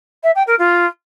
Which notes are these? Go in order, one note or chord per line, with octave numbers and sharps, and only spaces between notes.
E5
G5
A#4
F4